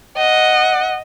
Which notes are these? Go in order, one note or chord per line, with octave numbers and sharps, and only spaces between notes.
D#5 F#5